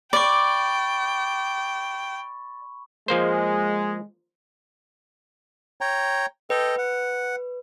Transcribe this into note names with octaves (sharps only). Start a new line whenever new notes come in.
D5 G5 B5 C#6
F3 G#3 A#3 C5
C#5 G5 A#5
A4 B4 D#5 G5
F#5